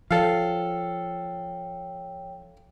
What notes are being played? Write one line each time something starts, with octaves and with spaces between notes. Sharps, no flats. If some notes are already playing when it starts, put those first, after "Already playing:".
F3 A4 C#5 F5 G5